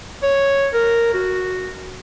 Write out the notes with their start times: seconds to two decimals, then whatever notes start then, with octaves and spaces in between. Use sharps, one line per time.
0.23 C#5
0.74 A#4
1.14 F#4